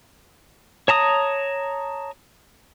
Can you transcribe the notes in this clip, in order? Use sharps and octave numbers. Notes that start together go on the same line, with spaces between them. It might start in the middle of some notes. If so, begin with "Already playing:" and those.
C#5 A5 A#5 D#6